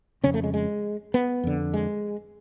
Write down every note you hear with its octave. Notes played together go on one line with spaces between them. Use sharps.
F2 C#3 C#4
A3
G#3
G#3
B3
F2 D3
G#3